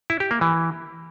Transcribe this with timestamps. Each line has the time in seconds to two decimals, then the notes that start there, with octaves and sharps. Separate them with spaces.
0.10 E4
0.20 G4
0.31 A#3
0.41 E3